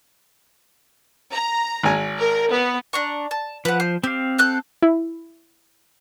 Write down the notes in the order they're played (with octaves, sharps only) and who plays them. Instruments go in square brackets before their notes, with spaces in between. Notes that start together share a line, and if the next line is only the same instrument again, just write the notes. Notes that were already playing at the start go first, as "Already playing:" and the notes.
[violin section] A#5
[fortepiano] G#1 G#5
[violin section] A#4
B3
[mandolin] D4 A#5 C#6
A5
[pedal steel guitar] F3 [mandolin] B4 F#5
[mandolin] C5
[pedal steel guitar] C4 F5 [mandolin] G4
[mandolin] A4 F#6 G6
[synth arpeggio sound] E4